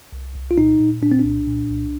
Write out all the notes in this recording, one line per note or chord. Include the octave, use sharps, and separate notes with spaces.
C2
C2
F4
A#2 D#4
A#2
A#2 D4
C4
D4
C2
A#2
C2